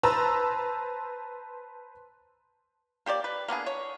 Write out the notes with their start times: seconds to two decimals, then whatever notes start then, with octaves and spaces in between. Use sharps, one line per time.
0.03 B4 C5 A5 A#5 E6
3.06 A#3 G4 C#5 D5
3.24 B4
3.48 A#3 B3 D4 G#4
3.66 C#5